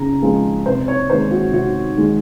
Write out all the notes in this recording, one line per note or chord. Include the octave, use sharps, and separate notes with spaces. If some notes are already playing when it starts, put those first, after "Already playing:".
Already playing: C#3 A#5
F3 G#3
C3 C5
C#5
D#3 G#3 C5
F#4
C3 F#4
D#3 G#3